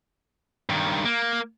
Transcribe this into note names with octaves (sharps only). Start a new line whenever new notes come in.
G2 D#3
A#3